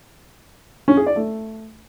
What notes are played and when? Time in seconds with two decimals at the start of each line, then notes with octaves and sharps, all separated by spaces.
0.88 C#4
0.97 G#4
1.07 D5
1.16 A3